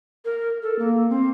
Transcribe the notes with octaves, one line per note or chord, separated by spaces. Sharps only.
A#4
A4
A#3
C4